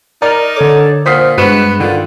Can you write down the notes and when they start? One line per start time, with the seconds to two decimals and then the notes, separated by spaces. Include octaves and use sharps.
0.22 D#4 A#4 D5 D6 F6
0.56 D3 A4 C#5 D5 D6
1.06 A#2 C5 F#5 D#6 F6 B6 C7
1.38 G2 G#3 B3 F#4 B4 F#6 E7
1.80 D3 D#3 F4 D5